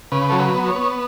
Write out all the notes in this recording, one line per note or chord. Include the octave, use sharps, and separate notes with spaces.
C#3 B4
F#3 A4
B4
B3
C#5
B3